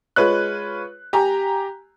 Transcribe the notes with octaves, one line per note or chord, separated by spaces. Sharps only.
G#3 F4 B4 C#5 F#6
G4 G#5 A#5